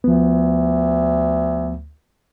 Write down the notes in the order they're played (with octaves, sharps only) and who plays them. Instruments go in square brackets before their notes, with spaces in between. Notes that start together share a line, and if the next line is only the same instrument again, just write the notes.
[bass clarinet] D2 [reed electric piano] F3 B3